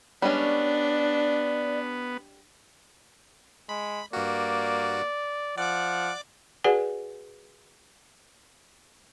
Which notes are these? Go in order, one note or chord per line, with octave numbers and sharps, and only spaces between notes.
G3 G#3 B3 C#4 D4 D5
G#3 B5
G2 A#3 F#4 D5
F3 D5 F#5 D6
F#4 G#4 B4 D5 F#5 G#5